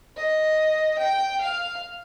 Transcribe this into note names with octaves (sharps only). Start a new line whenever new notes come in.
D#5
G5
F5